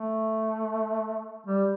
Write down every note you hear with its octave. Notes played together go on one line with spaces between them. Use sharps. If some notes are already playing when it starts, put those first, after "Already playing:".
Already playing: A3
G3